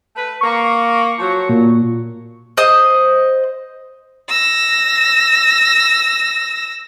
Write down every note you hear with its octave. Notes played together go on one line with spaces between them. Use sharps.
A3 B4
A#3 C#6
F3 F#3
A#2
C5 D#5 D#6
E6 A#6